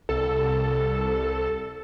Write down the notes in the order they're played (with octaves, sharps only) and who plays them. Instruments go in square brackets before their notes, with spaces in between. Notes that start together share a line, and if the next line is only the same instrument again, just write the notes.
[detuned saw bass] C2 [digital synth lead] A4